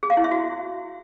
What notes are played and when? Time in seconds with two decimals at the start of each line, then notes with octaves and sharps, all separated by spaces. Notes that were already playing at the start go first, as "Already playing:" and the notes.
0.03 G#4
0.10 F5
0.17 E4
0.24 E5
0.31 F#4